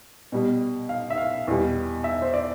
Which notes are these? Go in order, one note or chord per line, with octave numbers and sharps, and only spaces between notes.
B2 G3
F5
E5
F5
E2 B2 G3
E5
C5
D5